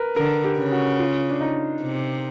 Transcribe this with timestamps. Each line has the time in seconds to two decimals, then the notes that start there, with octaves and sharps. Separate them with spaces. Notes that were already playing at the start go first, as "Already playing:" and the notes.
Already playing: A#4 B4
0.16 D3 A#4
0.44 G4
0.58 C#3
0.72 F#4
1.00 F4
1.30 D4
1.41 D#4
1.82 C3